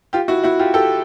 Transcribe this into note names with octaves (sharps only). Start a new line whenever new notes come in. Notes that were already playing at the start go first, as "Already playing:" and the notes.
F4 G4
E4 F#4
E4 F#4
F4 G4
G4 A4